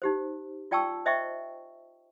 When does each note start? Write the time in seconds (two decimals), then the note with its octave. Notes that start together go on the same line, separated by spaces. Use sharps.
0.02 D#4 G4 C5
0.71 F4 D5 G5 A5 C#6 E6
1.06 C5 D#5 E5 G5 C#6